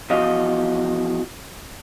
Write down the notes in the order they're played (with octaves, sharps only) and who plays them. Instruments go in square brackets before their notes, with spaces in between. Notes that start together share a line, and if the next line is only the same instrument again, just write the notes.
[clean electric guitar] E2 F3 F#4 D#5 F5